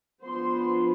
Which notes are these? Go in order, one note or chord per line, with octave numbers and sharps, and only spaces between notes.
F3 B3 D4 C5 C6